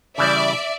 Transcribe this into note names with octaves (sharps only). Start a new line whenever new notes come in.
C#3 E3 G3 D5 E5